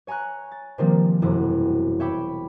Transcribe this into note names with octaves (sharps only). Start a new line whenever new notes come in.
C#5 G#5 A#5 C#6 F#6
A6
C3 D#3 F3 G3 A#3 C4
E1 F#2 C3 E4
C#5 E5 G5 B5 D6